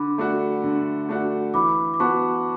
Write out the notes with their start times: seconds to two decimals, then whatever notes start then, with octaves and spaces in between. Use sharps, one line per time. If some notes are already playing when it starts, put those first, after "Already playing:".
Already playing: D3 B5 D6
0.18 A3 D4 F#4
0.64 D3
1.09 A3 D4 F#4
1.54 E3 B5 D6
1.94 D6
2.00 B3 F#4 A5 C#6